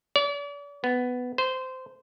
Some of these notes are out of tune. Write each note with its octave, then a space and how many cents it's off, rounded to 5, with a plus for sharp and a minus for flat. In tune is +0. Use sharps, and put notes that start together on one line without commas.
D5 -40
B3 +10
C5 -15